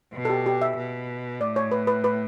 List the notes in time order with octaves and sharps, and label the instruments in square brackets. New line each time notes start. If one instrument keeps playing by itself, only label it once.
[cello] B2
[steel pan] A4
G4
G4
E5
[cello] B2
[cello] A2 [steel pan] D5
[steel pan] C#5
B4
B4
B4